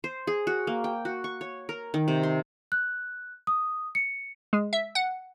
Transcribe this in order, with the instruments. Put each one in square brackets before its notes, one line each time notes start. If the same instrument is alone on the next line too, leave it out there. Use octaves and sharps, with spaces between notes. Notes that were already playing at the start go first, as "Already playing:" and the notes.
[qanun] C5
G#4
F#4
A#3
G5
F#4
C#6
C#5
A#4
D#3
C3
C6
[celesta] F#6
D#6
C#7
[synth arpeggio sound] G#3
E5
F#5